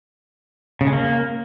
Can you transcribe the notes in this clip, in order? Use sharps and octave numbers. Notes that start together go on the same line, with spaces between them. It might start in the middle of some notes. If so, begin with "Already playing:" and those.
C#3
G#3
A#3